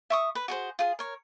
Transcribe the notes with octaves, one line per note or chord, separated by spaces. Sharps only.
E5 C#6 D#6
B4
F#4 G#4 C5
F4 G#4
A#4 C#5